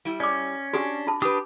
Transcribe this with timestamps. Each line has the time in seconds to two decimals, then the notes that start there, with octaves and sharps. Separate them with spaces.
0.05 G3 E4
0.20 C#4 D5 D6
0.73 D4 F#4 G4 G#5
1.07 F4 A5
1.22 D4 G4 B4 D6 D#6